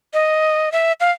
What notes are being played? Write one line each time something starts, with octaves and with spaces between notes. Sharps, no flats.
D#5
E5
F5